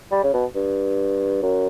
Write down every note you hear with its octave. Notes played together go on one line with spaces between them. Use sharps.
G3
C#3
B2
G2
F#2